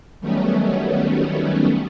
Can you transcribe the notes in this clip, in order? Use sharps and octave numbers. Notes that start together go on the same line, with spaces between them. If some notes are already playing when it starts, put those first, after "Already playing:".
D#3 F#3 G3 A3 B3 C#4